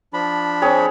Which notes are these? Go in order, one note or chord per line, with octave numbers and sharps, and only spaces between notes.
F3 D4 B5
C4 G#4 C#5